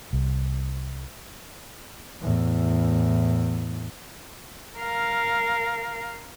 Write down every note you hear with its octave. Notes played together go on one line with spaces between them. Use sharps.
C2
E2 A2
A#4 F5